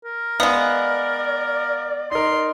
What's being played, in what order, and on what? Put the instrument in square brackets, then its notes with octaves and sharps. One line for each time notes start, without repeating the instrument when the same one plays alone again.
[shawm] A#4
[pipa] G#3 B3 [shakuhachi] D5 [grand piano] F5
[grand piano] D#4 A#4 [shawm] C6